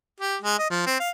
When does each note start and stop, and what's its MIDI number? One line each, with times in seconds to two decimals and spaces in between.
0.20 0.37 67
0.42 0.59 56
0.59 0.67 75
0.70 0.85 53
0.87 0.96 60
1.00 1.10 77